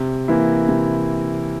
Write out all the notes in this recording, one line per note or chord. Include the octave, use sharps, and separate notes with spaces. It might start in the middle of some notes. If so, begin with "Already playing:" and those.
Already playing: C3
E3 A#3 E4
C3